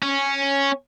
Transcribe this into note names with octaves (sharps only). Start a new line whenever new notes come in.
C#4